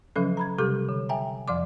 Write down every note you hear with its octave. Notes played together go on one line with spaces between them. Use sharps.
C#3 F3 F#3 C#4 A4
A#5 B5 G#6
C3 G3 G4 A4 D6 G6
D3
E5 G5 G#5 A#5
F2 F3 D5 C6 D6